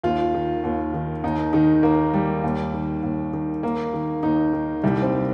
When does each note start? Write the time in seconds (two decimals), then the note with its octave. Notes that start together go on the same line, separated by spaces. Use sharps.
0.04 D#2 F4
0.34 D#3
0.64 D#2
0.94 D#3
1.24 D#2 D#4
1.53 D#3 D#4
1.83 D#2 A#3
2.13 D#3 G3
2.44 D#2
2.74 D#3
3.03 D#2
3.33 D#3
3.63 D#2 A#3
3.94 D#3
4.23 D#2 D#4
4.53 D#3
4.84 C2 G3
5.02 C4